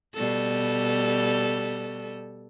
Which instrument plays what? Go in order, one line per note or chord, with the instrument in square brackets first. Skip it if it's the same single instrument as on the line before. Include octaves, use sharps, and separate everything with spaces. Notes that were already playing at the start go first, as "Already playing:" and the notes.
[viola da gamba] B2 G3 A4